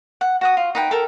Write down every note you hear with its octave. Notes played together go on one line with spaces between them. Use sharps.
F#5
F#4 F#5 D#6
F4
D#4 B4 G5
A4 A#4